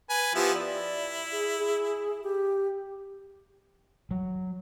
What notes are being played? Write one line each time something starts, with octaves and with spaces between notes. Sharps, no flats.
B4 G#5
F3 B3 E4 G4
E4 D5
G#4
G#4
G4
F#3